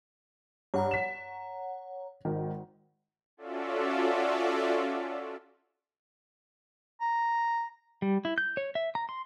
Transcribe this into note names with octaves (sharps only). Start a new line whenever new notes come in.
G2 C#5 F#5 A#5
B6 E7
G#1 D#3
C#4 F4 F#4 A4 D5 E5
A#5
G3
E4
G6
C#5
E5
A#5
C6